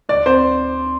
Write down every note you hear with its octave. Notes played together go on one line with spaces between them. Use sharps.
D2 D5
C4 C5